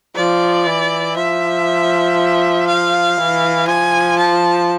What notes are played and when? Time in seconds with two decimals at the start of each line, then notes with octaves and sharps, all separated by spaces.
0.16 F3 D5
0.67 E3
1.16 F3 E5
2.67 F5
3.18 E3
3.67 F3 G#5
4.18 A5